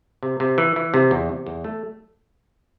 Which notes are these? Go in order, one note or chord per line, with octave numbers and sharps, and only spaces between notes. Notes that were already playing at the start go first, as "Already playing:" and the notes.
C3
C3
E3
E3
C3
E2
C3
E2
A3